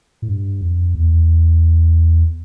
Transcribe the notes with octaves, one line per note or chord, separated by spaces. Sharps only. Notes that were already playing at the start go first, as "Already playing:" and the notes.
A2
G2
F2
E2